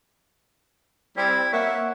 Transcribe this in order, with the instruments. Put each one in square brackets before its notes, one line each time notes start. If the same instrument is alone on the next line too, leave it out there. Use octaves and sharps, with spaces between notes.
[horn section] G3 C4 [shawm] E4
[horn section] A#3 C#5 E5 [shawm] F#5